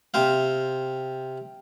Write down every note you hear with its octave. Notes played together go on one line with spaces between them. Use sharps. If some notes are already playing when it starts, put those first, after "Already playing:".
C3 C5 F5